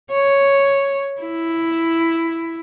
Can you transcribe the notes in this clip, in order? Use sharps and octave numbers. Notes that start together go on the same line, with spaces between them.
C#5
E4